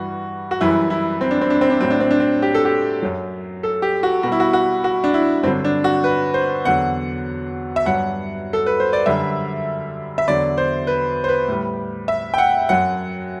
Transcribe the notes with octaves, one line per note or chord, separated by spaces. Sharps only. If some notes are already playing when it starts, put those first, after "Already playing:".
Already playing: G2 E3 G3 F#4
F#4
F#2 E3 G3 E4
E4
C4
D4
C4
D4
C4
D4
A2 F#3 C4
D4
C4
D4
C4
G4
A4
G4
F#2 F#3
A4
G4
F#4
B2 G3 F#4
E4
F#4
F#4
F#4
D4
E4
G2 D3 F#3 C4
D4
F#4
B4
C5
E2 D3 F#3 F#5
E5
G2 F#3 F#5
A4
B4
C5
D5
F#2 D3 G3 E5
E5
E2 D3 F#3 D5
C5
B4
C5
B4
A2 G3
E5
G5
F#5
F#2 F#3 F#5